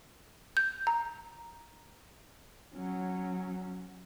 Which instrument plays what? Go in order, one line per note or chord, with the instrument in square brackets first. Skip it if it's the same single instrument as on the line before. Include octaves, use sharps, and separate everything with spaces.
[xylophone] G6
A#5
[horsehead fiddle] F#3 C#4